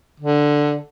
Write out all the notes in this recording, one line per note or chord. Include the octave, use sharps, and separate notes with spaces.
D3